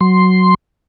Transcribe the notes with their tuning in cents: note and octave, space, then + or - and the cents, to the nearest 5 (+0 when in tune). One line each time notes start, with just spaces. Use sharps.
F#3 +0 C6 +0